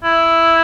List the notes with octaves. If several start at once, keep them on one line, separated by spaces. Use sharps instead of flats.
E4